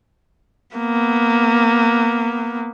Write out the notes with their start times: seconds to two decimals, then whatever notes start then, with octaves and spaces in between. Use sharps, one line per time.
0.76 A#3 B3